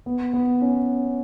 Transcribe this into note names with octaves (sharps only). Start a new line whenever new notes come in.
B3
B3
C#4